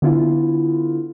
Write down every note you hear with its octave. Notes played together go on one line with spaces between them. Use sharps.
D3 B3 E4 F4